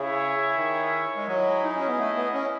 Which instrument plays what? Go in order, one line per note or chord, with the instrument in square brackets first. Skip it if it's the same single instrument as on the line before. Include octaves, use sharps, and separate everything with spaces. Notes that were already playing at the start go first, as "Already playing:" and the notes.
Already playing: [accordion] C#3 [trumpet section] E4 G#4 C#5 E5
[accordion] D#3
G#3
[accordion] F#3 [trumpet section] E4 G#4 D#5
[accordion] D#4
C#4
B3
A3
B3
C#4